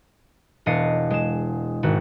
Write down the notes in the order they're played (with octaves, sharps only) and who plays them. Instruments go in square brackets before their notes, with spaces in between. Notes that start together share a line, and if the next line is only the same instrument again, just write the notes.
[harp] E1 D4 D#5 F5 C#7
G#3 E7
G#1 F#4